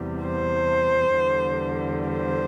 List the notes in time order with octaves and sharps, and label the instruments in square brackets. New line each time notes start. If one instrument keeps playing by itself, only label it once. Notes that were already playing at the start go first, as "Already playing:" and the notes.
Already playing: [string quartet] E2 C3 G3
C5
E2 D3 G3
C5